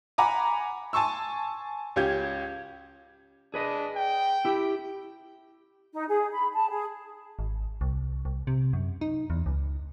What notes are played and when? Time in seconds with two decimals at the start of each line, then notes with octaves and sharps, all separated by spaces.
0.18 F#5 G#5 A#5 B5 D6
0.93 G#5 A5 C6 C#6 E6
1.96 C#2 C#4 G4 G6 G#6
3.54 D4 G#4 B4 D#5
3.96 G5
4.45 E4 G4
5.93 D#4
6.09 G#4
6.32 B5
6.54 A5
6.69 G#4
7.39 G#1
7.81 C2
8.25 C2
8.47 C3
8.73 F#2
9.01 D#4
9.30 E2
9.46 C#2